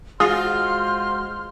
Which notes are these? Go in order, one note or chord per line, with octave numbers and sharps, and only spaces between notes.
G#3 F4 F#4 G#4 C5 C6 F6